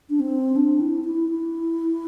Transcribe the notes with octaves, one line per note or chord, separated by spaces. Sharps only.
D4
C4
D4
E4
E4
E4